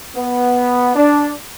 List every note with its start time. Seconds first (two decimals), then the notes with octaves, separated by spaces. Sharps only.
0.16 B3
0.95 D4